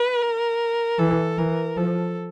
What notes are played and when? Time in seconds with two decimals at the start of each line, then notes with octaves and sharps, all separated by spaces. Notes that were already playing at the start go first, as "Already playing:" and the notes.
Already playing: B4
0.22 A#4
0.99 E3 A4
1.38 E3 A#4
1.77 F3 A4